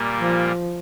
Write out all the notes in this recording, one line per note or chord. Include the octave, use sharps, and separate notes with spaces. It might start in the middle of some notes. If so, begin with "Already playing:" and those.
Already playing: A#2 G3 A#3
F3